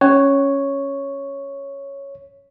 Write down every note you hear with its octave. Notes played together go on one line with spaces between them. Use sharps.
C#4 C#5